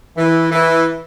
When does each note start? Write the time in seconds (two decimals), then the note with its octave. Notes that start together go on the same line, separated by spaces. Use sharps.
0.17 E3
0.52 E3